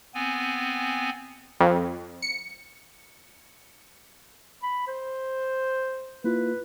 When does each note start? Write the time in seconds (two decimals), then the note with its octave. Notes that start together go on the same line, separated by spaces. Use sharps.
0.15 B3 C4 G#5
1.61 F2
2.22 C#7
4.63 B5
4.87 C5
6.24 A#3 E4 F4 B4